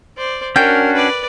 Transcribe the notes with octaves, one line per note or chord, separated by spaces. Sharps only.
C5 D5
C#4 D4 F#4 A#4 G5
B4 D5